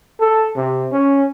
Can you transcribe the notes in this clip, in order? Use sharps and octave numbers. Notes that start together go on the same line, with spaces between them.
A4
C3
C#4